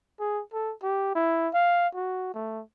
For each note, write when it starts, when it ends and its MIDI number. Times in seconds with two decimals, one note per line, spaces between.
0.20 0.41 68
0.53 0.73 69
0.82 1.12 67
1.15 1.49 64
1.54 1.88 77
1.95 2.31 66
2.34 2.62 57